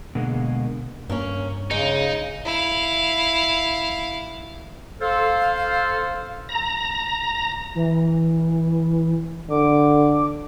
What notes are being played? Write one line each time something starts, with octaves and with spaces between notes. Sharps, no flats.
B2 D3 G#3 A#3
G2 A#3 C#4
C#3 G#3 D#4
E4 F5
A4 C5 F5
A#5
E3
D3 D6